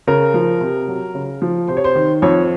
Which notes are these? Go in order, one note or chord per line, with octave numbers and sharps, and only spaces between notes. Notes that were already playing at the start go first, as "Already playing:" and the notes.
C#3 A#4
F3
C3
F#3
C#3
F3
C3 C5
C#5
C5
D#3
F2 C#5